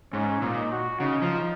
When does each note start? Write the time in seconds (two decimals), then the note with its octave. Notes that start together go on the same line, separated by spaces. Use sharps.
0.13 G#2 C#4
0.42 A#2 D#4
0.71 F#4
1.00 C#3 D#4
1.22 F3